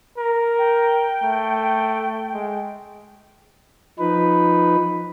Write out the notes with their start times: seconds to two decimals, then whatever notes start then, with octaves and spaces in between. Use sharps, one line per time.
0.18 A#4
0.58 G5
1.23 A3
2.34 G#3
3.99 F3 D#4 B4